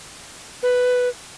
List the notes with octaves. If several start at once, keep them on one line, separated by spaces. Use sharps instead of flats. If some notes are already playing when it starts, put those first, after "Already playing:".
B4